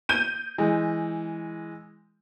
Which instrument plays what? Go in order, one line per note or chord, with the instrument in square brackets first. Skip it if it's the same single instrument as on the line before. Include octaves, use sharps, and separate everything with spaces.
[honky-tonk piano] G6 D#7
[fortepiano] E3 G#3